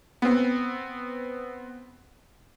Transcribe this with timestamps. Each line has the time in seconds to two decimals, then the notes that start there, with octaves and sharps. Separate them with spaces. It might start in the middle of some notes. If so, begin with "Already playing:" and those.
0.22 B3 C4